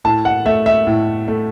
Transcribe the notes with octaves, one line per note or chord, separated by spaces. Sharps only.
A2 A5
F#5
A3 E5
E5
A2
A3